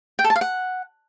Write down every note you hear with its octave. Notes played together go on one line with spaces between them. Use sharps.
G5
A4
A5
F5
F#5